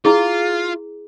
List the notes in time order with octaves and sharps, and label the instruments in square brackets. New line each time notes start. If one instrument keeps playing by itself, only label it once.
[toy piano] E4 G#4 [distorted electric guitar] F4